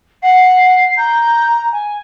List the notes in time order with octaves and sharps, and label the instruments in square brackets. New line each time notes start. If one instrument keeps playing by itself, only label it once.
[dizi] F#5 [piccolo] C7
[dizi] A#5 [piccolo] G6
[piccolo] G#5